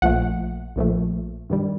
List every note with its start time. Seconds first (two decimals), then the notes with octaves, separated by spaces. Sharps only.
0.02 A#1 A#2 F3 A3 F#5
0.76 A#1 A#2 F3 A3
1.50 G2 D#3 G3